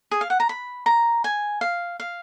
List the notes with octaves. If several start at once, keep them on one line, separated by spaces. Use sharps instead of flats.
G#4
F5
F#5
A#5
B5
A#5
G#5
F5
F5